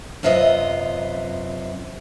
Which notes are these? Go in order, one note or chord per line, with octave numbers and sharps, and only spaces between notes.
F#2 C3 F4 B4 D#5